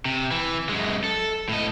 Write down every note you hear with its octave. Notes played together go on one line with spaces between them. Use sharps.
C3
E3
F#2 G#3
A4
A2 D#5